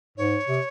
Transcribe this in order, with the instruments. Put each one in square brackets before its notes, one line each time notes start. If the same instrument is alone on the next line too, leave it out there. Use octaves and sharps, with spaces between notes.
[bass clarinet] G#2 [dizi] C#5
[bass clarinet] C3